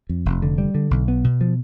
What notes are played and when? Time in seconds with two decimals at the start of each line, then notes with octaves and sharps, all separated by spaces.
0.09 F2
0.26 F1
0.42 D3
0.58 G3
0.75 D3
0.91 B1
1.08 B3
1.24 B2
1.41 F3